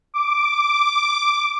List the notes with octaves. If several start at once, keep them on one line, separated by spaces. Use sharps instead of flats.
D6